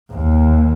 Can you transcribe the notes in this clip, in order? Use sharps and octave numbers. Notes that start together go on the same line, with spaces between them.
D#2